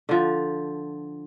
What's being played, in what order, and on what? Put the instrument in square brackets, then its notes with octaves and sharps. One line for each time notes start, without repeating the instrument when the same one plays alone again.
[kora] D3 F3